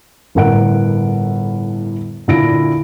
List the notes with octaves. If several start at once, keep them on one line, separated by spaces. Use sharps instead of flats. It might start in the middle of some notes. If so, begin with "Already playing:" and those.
G1 A2 A#4 F#5 D7
A#2 D3 E4 A#6 D7